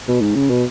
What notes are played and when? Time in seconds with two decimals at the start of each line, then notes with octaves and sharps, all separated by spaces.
0.08 B2
0.21 G#2
0.35 C#3
0.50 B2